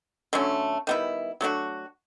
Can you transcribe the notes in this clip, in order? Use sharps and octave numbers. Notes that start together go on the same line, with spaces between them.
D3 F#3 A3 C#4
D#3 G3 B3 E4
F#3 A3 D4 F#4